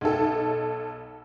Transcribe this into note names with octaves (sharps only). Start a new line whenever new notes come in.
B1 A4